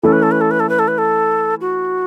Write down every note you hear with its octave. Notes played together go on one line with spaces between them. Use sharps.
E3 A3 C#4 A4
B4
A4
B4
A4
B4
A4
B4
A4
B4
A4
F#4